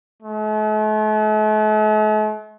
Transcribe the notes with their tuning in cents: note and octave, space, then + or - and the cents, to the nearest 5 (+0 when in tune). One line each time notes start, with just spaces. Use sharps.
A3 -45